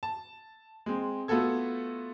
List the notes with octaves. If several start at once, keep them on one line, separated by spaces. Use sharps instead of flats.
A5
G#3 C4
A3 B3 F4 F#4 A4 G#6